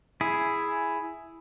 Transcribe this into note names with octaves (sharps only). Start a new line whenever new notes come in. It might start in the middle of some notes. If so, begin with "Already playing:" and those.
E4 G#4